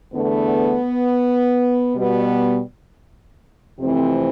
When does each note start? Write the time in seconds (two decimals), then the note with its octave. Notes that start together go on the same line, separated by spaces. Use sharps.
0.13 E2 D3 A3 B3
1.96 B2 G3 B3
3.79 F2 C3 E3 A3 C4